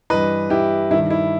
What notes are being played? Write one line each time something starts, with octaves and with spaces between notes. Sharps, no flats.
G2 E3 B4 D#5
E4 G4
G2 D#3 E4
E4